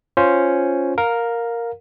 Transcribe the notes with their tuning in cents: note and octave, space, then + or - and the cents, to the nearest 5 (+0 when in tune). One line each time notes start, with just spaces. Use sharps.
C#4 +0 F4 +0 C5 +0
A#4 +0 F5 +20